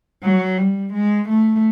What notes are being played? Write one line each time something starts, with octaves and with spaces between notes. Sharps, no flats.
F#3
G3
G#3
A3